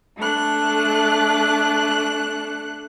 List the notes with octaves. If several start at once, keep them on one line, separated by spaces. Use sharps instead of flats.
A3 D4 F#6